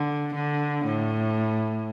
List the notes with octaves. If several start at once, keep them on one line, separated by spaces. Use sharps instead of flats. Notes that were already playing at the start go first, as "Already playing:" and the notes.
Already playing: D3
D3
A2